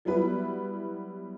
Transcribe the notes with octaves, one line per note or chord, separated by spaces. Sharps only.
F#3 G3 B3 E4 B4